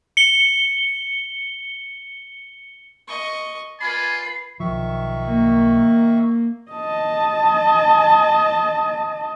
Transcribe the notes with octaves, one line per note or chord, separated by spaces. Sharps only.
C#7 G7
D#5 C#6
F4 B4 D5 G#5 B5 C7
B1 D#3 F3 E5 C#6
A#3
D#5 A5